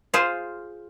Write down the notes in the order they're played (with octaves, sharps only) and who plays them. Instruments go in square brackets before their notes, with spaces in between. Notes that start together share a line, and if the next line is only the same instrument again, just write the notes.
[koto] F4 G#4 C5 F5